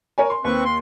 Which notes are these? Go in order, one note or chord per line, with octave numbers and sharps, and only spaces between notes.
A#4 C#5 G#5
C6
D#2 C4 B4 C#6
C6